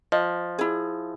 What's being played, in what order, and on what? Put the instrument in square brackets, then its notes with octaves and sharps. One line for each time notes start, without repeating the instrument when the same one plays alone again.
[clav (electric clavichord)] F3 [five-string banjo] D#5
[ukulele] E4 G#4